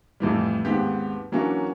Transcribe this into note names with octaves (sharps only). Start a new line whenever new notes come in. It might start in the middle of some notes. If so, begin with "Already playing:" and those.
F2 A2 E3 G3
D#2 G#2 B3 C4 G4
E3 F#3 A#3 C#4 D4